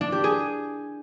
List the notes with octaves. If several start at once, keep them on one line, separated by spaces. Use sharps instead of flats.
D4
G4
G#4